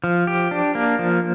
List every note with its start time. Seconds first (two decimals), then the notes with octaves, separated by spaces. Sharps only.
0.04 F3
0.27 G4
0.51 D4
0.75 A#3
0.99 F3